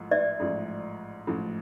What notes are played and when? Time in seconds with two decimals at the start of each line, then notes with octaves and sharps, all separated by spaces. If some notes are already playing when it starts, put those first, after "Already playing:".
Already playing: A1 G#2 F3 A3
0.11 D5 E5
0.40 A1 G#2 F3 A3
1.27 A1 G#2 F3 A3